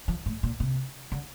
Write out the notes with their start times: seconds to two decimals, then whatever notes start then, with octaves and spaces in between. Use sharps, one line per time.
0.08 F3
0.26 A2
0.43 A#2
0.60 C3
1.12 D3